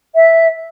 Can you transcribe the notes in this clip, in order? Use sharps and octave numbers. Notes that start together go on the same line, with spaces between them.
E5